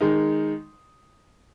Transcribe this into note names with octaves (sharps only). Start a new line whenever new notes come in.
D#3 G#3 D#4